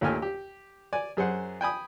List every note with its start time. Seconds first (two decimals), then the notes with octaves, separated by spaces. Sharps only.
0.01 D#2 A#2 A3 G4 G#5 F6
0.22 G4
0.93 D5 G#5
1.17 F#2 G#4 C5 F#5
1.61 G5 G#5 B5 D#6